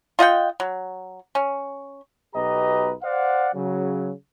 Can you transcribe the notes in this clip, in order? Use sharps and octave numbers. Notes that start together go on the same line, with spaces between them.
F4 D#5 F#5 G5
F#3
C#4
B1 B2 G4 B4 D#5 A#5
C5 D5 F5 F#5
C#3 F#3